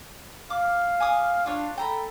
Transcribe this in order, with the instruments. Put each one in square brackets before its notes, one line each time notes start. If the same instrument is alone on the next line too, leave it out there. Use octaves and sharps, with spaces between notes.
[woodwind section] F5 [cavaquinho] D6
[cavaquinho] G#5 D6 D#6
[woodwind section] D4 [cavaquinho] F4 C#5
[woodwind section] A4 [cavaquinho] G5 A#5 B5